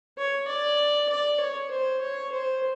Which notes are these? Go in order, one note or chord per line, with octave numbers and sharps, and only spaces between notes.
C#5
D5
D5
C#5
C5
C#5
C5